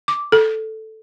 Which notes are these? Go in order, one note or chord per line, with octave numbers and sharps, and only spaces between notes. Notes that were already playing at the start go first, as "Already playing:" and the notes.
D6
A4